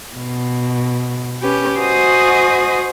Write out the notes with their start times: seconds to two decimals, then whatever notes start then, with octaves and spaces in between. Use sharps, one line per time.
0.16 B2
1.42 C#4 G4 B4
1.79 F#4 C5 D#5 G#5 D#6